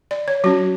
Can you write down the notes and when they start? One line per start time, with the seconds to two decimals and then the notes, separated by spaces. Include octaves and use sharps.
0.11 D5
0.28 C#5
0.44 F#3 C#4 F#4